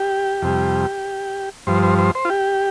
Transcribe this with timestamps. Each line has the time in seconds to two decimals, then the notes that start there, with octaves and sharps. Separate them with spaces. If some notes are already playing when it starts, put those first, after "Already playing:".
Already playing: G4
0.42 F2 C3 G3
1.67 G2 F3 C5
1.83 C5
1.98 C5
2.15 C5
2.25 F4
2.30 G4